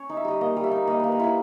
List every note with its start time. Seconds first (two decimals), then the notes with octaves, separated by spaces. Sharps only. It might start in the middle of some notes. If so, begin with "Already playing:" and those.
Already playing: C#4 C#5
0.09 D#4
0.17 E5
0.25 G3 D#5
0.41 A#3 D#5
0.56 G3
0.64 E5
0.71 D#4
0.87 A#3 D#5
1.00 A#3 B4
1.12 A#4
1.20 E4 B4